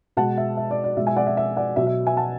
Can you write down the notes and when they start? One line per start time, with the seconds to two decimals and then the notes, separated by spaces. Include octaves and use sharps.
0.17 B2 G#3 F#5 A5
0.38 E5
0.57 E5
0.71 D5
0.84 D5
0.97 B2 G#3 E5
1.07 E5 G#5
1.16 D5 F#5
1.27 E5
1.37 E5
1.57 D5 F#5
1.76 B2 F#3 E5
1.87 E5
2.07 E5 G#5
2.17 F#5 A5